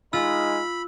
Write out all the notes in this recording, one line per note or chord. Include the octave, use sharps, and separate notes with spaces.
G#3 D#4 F4 B5 E6